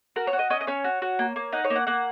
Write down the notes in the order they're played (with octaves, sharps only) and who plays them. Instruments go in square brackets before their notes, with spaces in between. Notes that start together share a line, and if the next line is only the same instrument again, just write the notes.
[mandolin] F#4 A#4
C#5
F#4
D#5
C#4 D#5
D#5
C#4 C#5
F#4
F#4
A#3
A#3
D#4 F#5
C#5
A#3
F#5
A#3 F#5